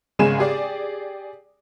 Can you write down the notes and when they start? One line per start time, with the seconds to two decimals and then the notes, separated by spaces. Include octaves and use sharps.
0.19 G#1 C#3 G#3 G#5 E7
0.39 G4 G#4 D5